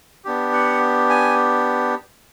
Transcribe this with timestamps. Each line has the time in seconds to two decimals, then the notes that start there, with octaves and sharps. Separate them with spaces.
0.25 B3 D4 G4
0.53 F#5
1.10 G#5